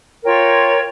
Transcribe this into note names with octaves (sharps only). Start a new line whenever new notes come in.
F4 A#4 C#5 G5